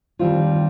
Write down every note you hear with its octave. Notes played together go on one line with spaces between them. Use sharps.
D#2 D#3 G3 C4 F4